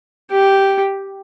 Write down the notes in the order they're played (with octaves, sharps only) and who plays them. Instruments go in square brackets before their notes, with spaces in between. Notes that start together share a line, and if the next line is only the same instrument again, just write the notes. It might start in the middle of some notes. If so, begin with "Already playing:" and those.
[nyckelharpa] G4